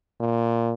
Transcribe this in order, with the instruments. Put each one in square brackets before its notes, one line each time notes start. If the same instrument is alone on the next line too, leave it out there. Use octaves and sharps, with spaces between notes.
[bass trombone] A#2